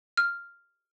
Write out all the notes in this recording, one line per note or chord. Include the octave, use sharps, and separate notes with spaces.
F6